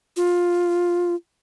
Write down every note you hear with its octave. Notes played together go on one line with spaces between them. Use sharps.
F4